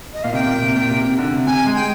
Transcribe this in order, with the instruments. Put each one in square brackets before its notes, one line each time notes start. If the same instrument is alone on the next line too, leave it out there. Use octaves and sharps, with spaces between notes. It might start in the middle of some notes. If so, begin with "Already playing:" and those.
[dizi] D#5
[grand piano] A#2 [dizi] F5
[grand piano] C3 [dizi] G5
[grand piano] A#2
C3
A#2
C3
C3
D3
C3
[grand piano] C3 [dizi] G#5
[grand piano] G#3
[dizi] G5